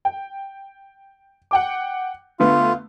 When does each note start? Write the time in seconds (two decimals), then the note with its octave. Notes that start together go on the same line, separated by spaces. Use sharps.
0.05 G5
1.51 F#5 G5 D6
2.40 D3 A3 B3 F4